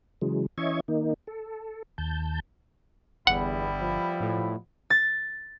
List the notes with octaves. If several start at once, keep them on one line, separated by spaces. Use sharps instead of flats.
C#3 E3 F#3 G#3
E3 C#4 D#5 E5 C#6 G#6
D#3 A#3 D#4
A4
D#2 A5 G6
G1 E2 G3 B3 E4 F#5
F3
A2
A6